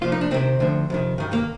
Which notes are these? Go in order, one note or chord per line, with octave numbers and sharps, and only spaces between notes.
C2 A#2 F3 F4
D#4
D4
C2 C3 D#3 C4
D2 D3 F3
F2 C3 D#3
G2 D#3
A#3